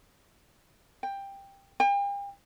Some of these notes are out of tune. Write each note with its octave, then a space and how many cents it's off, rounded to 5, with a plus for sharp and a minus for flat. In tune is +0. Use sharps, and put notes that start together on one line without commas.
G5 +10
G5 +40